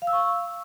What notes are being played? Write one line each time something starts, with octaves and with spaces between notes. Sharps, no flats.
F5
E6
C#6
E6